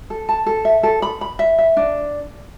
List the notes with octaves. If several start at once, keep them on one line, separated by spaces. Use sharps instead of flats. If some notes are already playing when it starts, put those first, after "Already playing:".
A4
A5
A4
E5
A4
B5
B5
E5
E5
D4